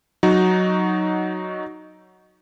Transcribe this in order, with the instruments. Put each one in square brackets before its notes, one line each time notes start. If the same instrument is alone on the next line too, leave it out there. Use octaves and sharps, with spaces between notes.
[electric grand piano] F#3 D#4 F#4